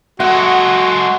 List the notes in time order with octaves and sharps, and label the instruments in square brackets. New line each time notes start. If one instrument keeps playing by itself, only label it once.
[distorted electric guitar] G#3 A4 [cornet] F#4 [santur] F#5